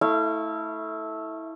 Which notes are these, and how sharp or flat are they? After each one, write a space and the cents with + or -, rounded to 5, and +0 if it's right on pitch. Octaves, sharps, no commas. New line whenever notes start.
A3 +0 E4 -20 F5 -40